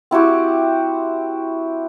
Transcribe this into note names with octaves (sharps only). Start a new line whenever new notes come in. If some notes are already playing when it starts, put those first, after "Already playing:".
C4 E4 F#4 G4